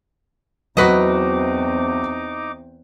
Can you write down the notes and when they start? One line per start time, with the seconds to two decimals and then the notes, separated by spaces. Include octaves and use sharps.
0.77 E2 F#3 C4 D#4 F#4 B4 D#5 D6